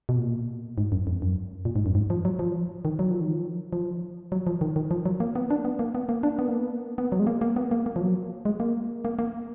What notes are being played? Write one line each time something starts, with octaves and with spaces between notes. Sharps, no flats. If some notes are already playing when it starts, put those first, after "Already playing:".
B2
A#2
G#2
F#2
F2
F#2
A#2
G#2
F#2
G#2
F3
F#3
F3
D#3
F#3
F3
D#3
F3
F3
F#3
F3
D#3
D#3
F3
F#3
A#3
B3
D4
B3
A#3
B3
A#3
D4
B3
A#3
B3
B3
F#3
G#3
A#3
A#3
B3
A#3
A#3
F3
F#3
G#3
A#3
A#3
A#3